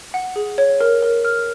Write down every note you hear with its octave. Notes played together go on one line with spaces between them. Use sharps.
F#5
G#4
C#5
A#4
A#4
F6